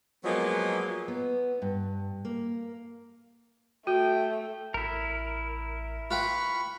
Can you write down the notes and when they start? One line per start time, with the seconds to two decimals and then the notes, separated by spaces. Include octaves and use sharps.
0.25 F3 F#3 G#3 A#3 B3
1.08 B3
1.62 G2
2.25 A#3
3.87 A3 F#4 G5
4.74 A1 E4 A#4
6.11 F4 B4 G5 B5 C#6